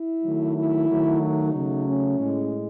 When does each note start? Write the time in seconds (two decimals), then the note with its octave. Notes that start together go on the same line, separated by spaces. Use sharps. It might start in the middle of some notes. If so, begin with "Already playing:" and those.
Already playing: E4
0.24 D#3 F#3 A3
0.56 E4
0.88 D#3 F#3 A3
1.20 D#4
1.53 C#3 F#3 A3
1.85 C#4
2.18 A2 G#3